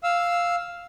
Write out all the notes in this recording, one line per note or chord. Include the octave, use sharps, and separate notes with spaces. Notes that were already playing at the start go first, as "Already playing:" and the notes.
F5 E6